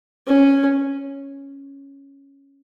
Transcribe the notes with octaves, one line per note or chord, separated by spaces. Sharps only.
C#4